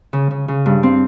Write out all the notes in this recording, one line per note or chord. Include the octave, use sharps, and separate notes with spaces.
C#3
C#3
C#3
G2
C4